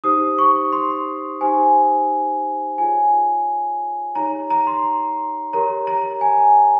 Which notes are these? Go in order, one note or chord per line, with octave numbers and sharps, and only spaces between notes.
D#4 G4 C5 D#6
C#6
C6
D#4 G4 C5 G#5
F4 G#4 C#5 G#5
D#4 G4 C#5 A#5
A#5
C6
G4 A#4 C#5 A#5
A#5
G#5